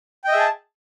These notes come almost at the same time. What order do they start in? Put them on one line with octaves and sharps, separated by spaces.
G5 D#5 E5 G#4 A5